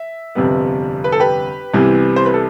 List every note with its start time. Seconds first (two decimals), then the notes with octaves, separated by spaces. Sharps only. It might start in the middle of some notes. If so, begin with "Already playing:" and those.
Already playing: E5
0.35 G1 F2 C3 G3 B3
1.04 B4
1.12 A4
1.20 G4 B4
1.74 C2 C3 E3 G3 B3
2.16 C5
2.26 B4
2.34 A4